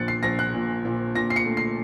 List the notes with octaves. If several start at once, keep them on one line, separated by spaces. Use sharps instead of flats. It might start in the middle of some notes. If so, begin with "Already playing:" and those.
Already playing: A#1 A#2 F#6 A6 C#7
C7
A#1 A#6
F#6
A#2
A#2
A#2 A#6
C7
C#7
A3
C7